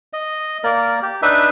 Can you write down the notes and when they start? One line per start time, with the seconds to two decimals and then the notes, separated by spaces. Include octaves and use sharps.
0.13 D#5
0.64 A#3 A#4 D5
1.02 G4
1.22 D4 D#4 B4 E5